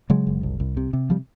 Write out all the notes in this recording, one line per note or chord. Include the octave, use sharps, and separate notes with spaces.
C#3 F#3 G#3
F#1
C2
C2
C3
C3
F3 G3